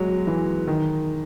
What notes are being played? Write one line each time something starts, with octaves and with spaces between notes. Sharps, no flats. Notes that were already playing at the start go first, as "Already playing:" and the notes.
Already playing: F#3 G#3
E3
D#3